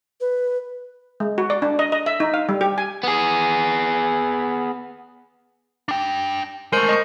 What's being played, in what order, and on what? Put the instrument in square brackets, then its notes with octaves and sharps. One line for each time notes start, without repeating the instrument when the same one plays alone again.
[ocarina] B4
[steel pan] G#3
F#4
D5
D4
D#5
D#5
E5
D#4
F5
G3
G4
G#5
[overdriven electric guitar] B3 G#4
[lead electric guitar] D4 G5
[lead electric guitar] G#3 A3 [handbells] A#4 C5 G6
[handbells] D#5 C#6